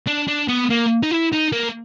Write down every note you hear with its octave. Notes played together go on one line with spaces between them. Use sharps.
D4
D4
B3
A#3
D#4
E4
D#4
A#3